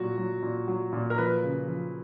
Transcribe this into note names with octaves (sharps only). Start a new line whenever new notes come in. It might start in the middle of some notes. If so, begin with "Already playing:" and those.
Already playing: A#2 F#3 F#4
F#3
A#2
F#3
A#2
A#4
F3 B4
C#3
F3